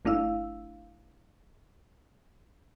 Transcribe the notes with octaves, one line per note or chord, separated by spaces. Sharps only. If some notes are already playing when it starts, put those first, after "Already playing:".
G1 A3 D4 E4 F5 E6